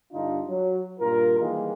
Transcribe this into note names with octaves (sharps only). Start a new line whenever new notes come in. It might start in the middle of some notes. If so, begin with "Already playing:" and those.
G2 D3 D4 D#4 F4
F#3
G2 A#2 F4 A#4
D#3 E3 G3 G#3 A#3